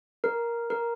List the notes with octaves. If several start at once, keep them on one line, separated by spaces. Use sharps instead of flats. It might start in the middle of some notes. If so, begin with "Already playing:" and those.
A#4
A#4